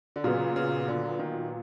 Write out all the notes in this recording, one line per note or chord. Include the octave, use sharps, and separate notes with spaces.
D3
A#2 C#3 F#3 B3
C#3
D3
D#3